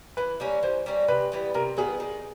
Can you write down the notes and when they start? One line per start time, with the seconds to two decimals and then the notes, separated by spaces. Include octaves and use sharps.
0.17 E3 B4
0.40 G3 A#3 C#4
0.63 E3 C5
0.86 G3 A#3 C#4
1.08 C3 B4
1.32 E3 G3 B3
1.54 C3 A#4
1.77 E3 G3 B3 G#4
2.00 D#3